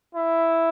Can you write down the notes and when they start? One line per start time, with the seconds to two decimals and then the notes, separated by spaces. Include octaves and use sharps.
0.15 E4